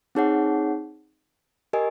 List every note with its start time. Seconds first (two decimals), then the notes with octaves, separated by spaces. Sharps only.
0.15 C4 D#4 G#4 C#5 F#5
1.73 G4 A#4 D#5 G#5